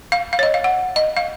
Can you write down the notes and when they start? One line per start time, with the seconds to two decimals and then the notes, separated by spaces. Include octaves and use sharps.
0.12 F5
0.33 F5
0.39 C#5
0.43 D#5
0.54 F5
0.64 F#5
0.96 D#5
1.17 F5